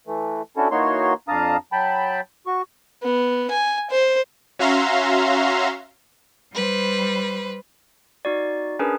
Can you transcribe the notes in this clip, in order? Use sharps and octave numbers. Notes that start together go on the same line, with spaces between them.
E3 A3
C#4 D4 E4 F#4 A4
E3 A#3 D#4 F#4 C#5 C6
F2 D4 F5 A5 A#5 D#6
F#3 G5 A5 B5
F#4 C#6
B3
G#5
C5
C#4 F#4 E5 F5 A#5 C6
G3 B4 C5
D#4 F#4 D5
C#4 D4 G#4 A#4 B4